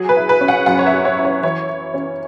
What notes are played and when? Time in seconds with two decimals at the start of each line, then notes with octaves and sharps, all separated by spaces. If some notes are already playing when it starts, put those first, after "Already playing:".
Already playing: F#3 G#4
0.09 B4
0.17 E4
0.29 B4
0.41 C#4
0.48 F#5
0.66 F#2 F#5
0.79 C#5
0.87 E5
0.93 F#3
1.05 C#5
1.18 E4
1.25 C#5
1.43 E3 C#5
1.69 E4
1.94 C#4